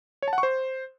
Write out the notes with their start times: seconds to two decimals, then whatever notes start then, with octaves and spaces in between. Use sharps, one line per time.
0.22 C#5
0.28 A5
0.33 F#5
0.38 C#6
0.43 C5